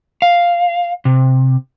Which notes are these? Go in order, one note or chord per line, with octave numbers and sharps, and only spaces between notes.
F5
C3